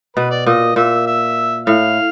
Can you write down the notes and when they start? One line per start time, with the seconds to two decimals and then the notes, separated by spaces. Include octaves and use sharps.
0.17 B2 B4
0.31 D5
0.46 A#2 D#5
0.76 A#2 E5
1.07 E5
1.66 A2 F5